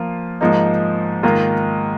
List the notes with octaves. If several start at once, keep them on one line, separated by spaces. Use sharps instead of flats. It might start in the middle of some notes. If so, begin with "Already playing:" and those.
Already playing: F3 A#3 F4
G#2 F3 A#3 D#4
G#2 D#3 A#3 F4